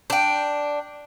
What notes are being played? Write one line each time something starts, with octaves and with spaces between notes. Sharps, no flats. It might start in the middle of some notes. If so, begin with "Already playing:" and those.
D4 G5